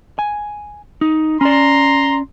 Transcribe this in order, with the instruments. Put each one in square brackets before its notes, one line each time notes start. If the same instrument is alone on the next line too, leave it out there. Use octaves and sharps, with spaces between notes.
[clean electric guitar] G#5
D#4
[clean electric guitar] C#4 D5 [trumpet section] A#5 C6